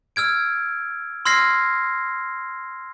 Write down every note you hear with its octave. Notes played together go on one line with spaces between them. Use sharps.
E6 F6 G#6 D7
C6 E6 F6 G#6 A#6 C7